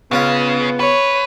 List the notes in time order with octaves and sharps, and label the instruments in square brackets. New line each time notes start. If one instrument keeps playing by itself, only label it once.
[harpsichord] C#2 C#4 F4 [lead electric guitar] C#3 [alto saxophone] B3
[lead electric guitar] B4 [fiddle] C#5